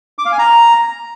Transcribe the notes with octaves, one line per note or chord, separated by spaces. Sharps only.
D6
F5
G#5
A#5